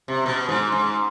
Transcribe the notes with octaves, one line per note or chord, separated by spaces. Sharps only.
C3
B2
G#2
G#2